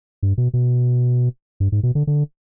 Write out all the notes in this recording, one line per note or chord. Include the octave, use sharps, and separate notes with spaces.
G2
B2
B2
G2
G#2
B2
D3
D3